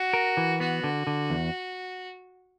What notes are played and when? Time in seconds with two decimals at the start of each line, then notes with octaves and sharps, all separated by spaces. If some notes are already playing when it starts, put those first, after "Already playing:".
Already playing: F#4
0.14 A#4
0.37 E3
0.60 B3 F#4
0.84 D3
1.07 D3
1.30 E2